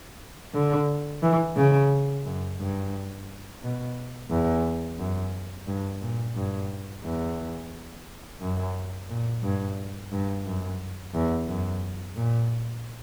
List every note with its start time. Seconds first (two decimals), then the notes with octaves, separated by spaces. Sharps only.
0.54 D3
1.23 E3
1.56 C#3
2.25 F#2
2.60 G2
3.63 B2
4.30 E2
4.98 F#2
5.67 G2
6.02 A#2
6.36 G2
7.04 E2
8.41 F#2
9.10 A#2
9.43 G2
10.12 G2
10.45 F#2
11.14 E2
11.48 F#2
12.16 A#2